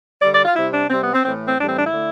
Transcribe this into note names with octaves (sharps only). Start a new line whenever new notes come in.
D3 G3 D5
D5
F4
C3 G3 E4
D4
C3 G3 C4
B3
C4
A2 E3 A3 C4
C4
A2 E3 G3 D4
C4
D4
E4
D3 A3